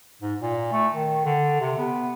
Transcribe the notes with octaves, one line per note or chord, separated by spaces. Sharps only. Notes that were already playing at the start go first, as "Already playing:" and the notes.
G#2
A#2
A3
D#3
D3
C3
B3